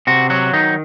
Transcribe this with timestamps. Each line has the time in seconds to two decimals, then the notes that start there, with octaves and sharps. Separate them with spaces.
0.07 C3 F#4
0.30 F#3 F#4
0.53 D#3 D#4